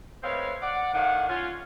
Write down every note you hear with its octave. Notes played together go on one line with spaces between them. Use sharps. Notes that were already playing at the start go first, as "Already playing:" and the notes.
G#3 A3 C4 B4 C#5 F5
D5 F#5
A2 D#3 D4 F5 F#5
C#4 F4